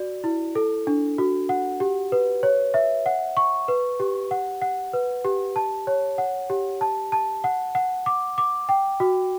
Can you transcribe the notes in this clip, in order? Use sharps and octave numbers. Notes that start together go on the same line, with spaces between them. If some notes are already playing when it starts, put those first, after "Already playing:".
Already playing: F#4 D5
E4
A4
D4
F#4
F#5
G4
B4
C#5
E5
F#5
C#6
B4
G4
F#5
F#5
B4
G4
A5
C#5
F#5
G4
A5
A5
F#5
F#5
D6
D6
G5
F#4